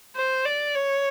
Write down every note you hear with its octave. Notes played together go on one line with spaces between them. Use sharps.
C5
D5
C#5